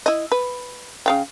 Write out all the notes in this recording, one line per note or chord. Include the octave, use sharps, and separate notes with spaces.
E4 D#5
B4
C#3 F5 G5